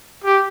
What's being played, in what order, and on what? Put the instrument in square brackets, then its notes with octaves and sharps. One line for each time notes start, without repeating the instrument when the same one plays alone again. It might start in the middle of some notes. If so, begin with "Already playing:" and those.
[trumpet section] G4